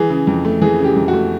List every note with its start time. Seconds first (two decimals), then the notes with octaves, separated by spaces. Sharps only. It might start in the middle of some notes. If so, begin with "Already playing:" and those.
Already playing: E3 G#4
0.10 C#3
0.27 F2
0.45 A3
0.61 E3 G#4
0.79 C#3
0.84 G4
0.96 F2
1.08 F#4
1.13 A3